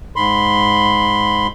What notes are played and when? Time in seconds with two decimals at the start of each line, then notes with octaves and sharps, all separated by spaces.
0.16 G#2 B5 C6